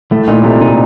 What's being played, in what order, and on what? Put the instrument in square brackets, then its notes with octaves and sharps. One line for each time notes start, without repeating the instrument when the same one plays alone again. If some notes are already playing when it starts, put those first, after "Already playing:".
[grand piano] A2 [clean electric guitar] A3
[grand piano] A#2 [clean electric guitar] D#4
[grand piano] C3 [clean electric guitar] A3
[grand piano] A#2 [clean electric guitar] D#4